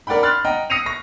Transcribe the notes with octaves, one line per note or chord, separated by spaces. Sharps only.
A#4 D5 F#5 G5 B5
B5 C6 F6 F#6 A6
D#5 F#5 G5 A#5
D#6 A#6 C7 C#7 D#7 F7
C#6 A#6